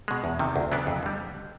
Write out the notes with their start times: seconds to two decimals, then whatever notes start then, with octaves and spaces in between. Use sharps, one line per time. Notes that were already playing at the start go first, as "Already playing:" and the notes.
0.08 B2 G#3
0.24 E2
0.39 C3 D#3
0.56 D2
0.72 C#3 F#3 B3 D4
0.87 F2
1.03 D3 G3